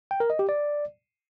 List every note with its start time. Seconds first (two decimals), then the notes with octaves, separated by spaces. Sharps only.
0.11 G5
0.20 A#4
0.30 D#5
0.39 G4
0.49 D5